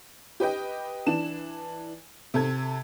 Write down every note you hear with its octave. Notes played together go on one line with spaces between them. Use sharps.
G4 B4 D#5 G5
E3 D4 E7
C3 A4 G#6